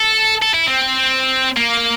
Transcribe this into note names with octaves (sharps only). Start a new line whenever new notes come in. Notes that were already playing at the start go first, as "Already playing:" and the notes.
Already playing: A4
A4
E4
C4
A#3